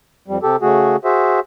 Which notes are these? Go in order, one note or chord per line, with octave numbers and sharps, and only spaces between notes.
F2 G3
C3 G4 A4
C#3 A3 F#4 G#4
F#4 G#4 C5 E5